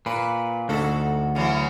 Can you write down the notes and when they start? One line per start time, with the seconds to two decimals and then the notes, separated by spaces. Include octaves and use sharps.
0.06 A#2 B4
0.69 D2 G#2 F#4 A4
1.35 C#3 E3 F#3